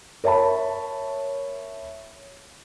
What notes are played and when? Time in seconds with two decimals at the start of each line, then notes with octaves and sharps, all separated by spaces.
0.24 A#4 C#5 E5 A5 B5